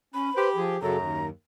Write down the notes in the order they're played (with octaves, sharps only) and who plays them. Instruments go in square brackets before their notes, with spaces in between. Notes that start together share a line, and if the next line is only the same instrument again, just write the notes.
[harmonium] C#4 [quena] B5
[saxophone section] G4 [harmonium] B4 C5
[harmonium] F3 G#4
[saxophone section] F#2 [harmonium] C#3 F#3 A4 [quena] A#5
[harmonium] D#2